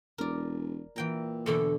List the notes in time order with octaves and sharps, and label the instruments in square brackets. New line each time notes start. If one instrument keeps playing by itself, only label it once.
[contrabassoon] E1 [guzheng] A#4 D5
[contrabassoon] A#2 [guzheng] E3 G5 A#5
[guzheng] E2 B2 D3 [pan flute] A4